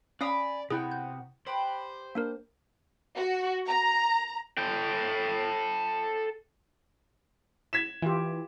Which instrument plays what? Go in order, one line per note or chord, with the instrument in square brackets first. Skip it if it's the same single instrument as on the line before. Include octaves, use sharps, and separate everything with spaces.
[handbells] C#4 F5 D#6 [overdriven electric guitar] D5 [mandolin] G#5 A#5 B5
[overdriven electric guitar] C3 [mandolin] B3 F#4 G5 [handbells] E4 G#4
[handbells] G6
[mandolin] G4 B4 D5 [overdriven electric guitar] C5
[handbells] A#3 D4 A#4
[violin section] F#4
A#5
[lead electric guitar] A4 G5
[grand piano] G#6 B6 E7
[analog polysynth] E3 [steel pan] F4 G4